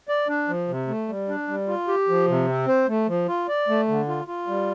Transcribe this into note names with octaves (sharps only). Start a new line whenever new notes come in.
D5
D4
F3
C3
A3
G3
D4
G3
F4
G4
F3
C3
C4
C5
A3
F3
F4
D5
A3
D3
F4
F4
G3